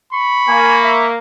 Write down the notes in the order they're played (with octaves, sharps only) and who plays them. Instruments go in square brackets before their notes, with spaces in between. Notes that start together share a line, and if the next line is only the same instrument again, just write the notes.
[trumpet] B5 [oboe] C#6
[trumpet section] A#3 [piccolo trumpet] G#5
[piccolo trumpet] E5